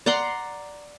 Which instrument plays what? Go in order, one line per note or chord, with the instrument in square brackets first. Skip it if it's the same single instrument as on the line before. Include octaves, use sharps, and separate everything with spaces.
[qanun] D5 F#5 A#5 C6